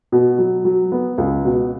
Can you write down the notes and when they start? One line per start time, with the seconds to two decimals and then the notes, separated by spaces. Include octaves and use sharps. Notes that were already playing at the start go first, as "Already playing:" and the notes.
0.12 B2
0.38 F#3
0.65 F#3
0.92 B3
1.18 C#2
1.45 B2